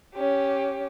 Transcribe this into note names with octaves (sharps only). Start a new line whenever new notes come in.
C#4 G4